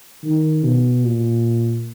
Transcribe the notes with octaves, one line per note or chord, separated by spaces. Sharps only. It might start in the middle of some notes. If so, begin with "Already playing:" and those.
D#3
B2
A#2